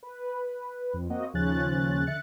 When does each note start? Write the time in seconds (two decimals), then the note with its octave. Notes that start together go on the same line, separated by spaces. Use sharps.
0.03 B4
0.94 F2
1.10 A#3 C4 F#4 D#5
1.33 D#2 C#3 F3 C#4 F#6 A6
2.07 D3 E5 F#6 A6 C#7